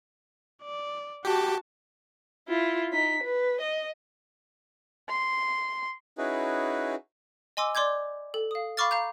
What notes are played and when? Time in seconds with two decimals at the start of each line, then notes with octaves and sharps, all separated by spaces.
0.62 D5
1.25 F#4 G4 A5
2.48 E4 F4
2.93 D#4 B6
3.23 B4
3.61 D#5
5.08 C6
6.18 C#4 D#4 E4 F#4 G#4 B4
7.57 D#5 G#5 C6 D6 E6
7.75 D5 C6 D6 G6 G#6
8.34 A4
8.51 F5 D#6
8.77 F5 B5 C#6 D6 F6 A6
8.91 F5 A#5 G6